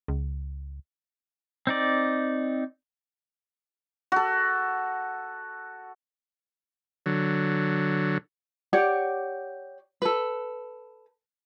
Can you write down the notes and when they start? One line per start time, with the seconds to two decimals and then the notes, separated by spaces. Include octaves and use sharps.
0.08 C#2
1.67 C4 D#4 D5
4.12 F#4 A4
7.06 D3 F#3
8.73 G4 C#5 D5 F#5
10.02 A4 B4